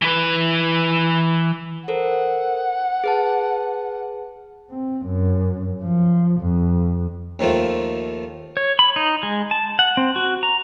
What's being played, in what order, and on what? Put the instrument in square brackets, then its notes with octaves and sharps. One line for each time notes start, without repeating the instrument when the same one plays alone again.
[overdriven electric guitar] E3 B4
[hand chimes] A4 A#4 C5 [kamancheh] F#5
[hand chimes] G#4 B4 A5
[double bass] C4
F#2
F3
F2
[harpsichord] D#2 D#3 F3 A3 F4
[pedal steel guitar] C#5
B5
D#4
G#3
A5
F#5
C4
F#4
A#5